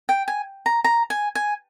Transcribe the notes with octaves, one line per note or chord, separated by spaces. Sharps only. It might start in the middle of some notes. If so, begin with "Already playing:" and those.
G5
G#5
A#5
A#5
G#5
G#5